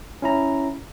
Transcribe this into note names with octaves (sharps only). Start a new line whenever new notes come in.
C#4 E4 A#5